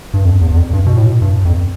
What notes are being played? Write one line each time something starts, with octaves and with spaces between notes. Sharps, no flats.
G2
F2
E2
E2
F2
G2
B2
A2
G2
F2